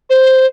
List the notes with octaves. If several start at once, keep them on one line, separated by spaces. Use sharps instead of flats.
C5